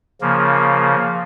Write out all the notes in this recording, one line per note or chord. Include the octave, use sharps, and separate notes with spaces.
C#3 F3 A#3